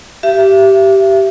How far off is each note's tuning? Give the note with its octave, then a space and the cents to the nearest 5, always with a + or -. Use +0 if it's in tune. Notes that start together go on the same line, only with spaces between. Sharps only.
G4 -15 E5 +30